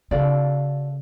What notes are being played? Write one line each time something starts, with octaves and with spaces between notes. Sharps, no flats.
C#3 F#4 A4 D5 F5